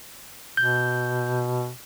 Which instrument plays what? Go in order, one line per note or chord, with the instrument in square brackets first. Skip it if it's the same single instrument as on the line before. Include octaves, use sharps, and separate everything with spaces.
[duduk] B2 [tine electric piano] G6